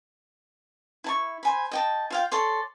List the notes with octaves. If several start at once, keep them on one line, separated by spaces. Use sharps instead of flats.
E4 A5 C#6
C5 G#5 B5
D#5 G5 A5
F4 F5 G5
A4 C#5 D5 C6